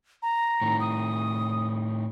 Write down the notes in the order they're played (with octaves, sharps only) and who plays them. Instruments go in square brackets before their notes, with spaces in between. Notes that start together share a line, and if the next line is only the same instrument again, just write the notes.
[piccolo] A#5
[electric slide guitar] A2 D#3
[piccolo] D#6